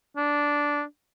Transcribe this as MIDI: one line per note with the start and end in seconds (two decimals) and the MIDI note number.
0.17 0.83 62